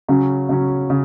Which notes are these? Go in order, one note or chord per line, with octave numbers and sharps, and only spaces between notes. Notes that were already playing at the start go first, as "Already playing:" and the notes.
C#3 F#3 C#4
C#3 F#3 C#4
C#3